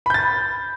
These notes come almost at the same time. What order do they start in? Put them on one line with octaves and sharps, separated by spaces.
B5 G6 A6